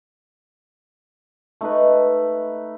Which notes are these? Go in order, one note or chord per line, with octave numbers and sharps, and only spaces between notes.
A3 D#4 B4